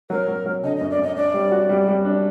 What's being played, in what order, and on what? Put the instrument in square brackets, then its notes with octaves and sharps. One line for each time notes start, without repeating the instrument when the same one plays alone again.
[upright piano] F#3 [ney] A#4
[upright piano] F#3
F#3
[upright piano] D3 [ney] D#5
[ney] D#5
[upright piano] F#2
[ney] D5
[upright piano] F#2 [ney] D#5
[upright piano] D4 [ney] D5
[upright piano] G3
F#4
G3
G3
D4